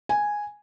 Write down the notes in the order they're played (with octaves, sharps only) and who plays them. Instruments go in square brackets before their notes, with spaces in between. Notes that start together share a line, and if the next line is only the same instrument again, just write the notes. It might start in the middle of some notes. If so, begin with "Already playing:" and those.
[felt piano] G#5